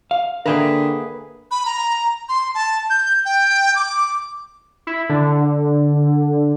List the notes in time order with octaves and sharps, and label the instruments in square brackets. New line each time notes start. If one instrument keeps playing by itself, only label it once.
[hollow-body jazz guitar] F5
[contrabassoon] D3 [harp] A#3 G#4 B4 [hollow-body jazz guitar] A#4 E5 G5
[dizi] B5
A#5
C6
A5
G6
G5
D6
[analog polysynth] E4
D3